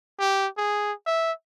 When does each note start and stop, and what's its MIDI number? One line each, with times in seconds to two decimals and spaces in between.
0.20 0.47 67
0.58 0.92 68
1.06 1.32 76